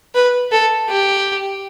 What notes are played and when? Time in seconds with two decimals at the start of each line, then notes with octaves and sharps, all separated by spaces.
0.15 B4
0.52 A4
0.89 G4